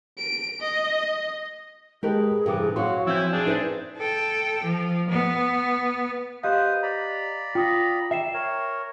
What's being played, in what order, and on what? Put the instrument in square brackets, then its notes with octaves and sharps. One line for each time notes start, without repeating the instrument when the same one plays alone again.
[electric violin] D7
D#5
[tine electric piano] G#3 D#5 A5 [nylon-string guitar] G4 A#4 B4 [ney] G#4
[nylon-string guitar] G2 C3 E3 [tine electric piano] A4 D6
[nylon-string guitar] F#3 F#4 [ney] F5 [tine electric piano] C6 C#6
[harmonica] E3 E4 E6 [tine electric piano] F3 G6 [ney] C4
[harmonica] D4 G#4
[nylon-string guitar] D#4 B4 E5 [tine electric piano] E4 [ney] C5
[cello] A4 G5
F3
B3
[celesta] G4 D#5 F5 [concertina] B4 C5 D#6
[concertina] D5 A#5 B5
[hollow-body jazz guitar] F4 [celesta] G5 D#6 A#6
[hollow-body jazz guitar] E5 [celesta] G5 C7 E7
[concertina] A#4 C#5